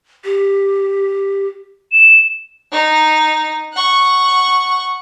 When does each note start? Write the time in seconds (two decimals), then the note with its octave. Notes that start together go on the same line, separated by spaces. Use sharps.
0.24 G4
1.92 E7
2.72 D#4
3.74 F#5 C#6